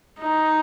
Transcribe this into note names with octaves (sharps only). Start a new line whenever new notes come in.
D#4